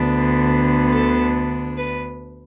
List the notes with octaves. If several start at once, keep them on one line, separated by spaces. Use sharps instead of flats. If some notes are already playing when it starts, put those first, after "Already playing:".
Already playing: D2 D3 B3 D4
A4
B4